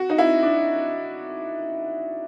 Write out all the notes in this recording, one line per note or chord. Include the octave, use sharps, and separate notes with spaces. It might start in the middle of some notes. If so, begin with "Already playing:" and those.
Already playing: F#4
D#4
E4
D4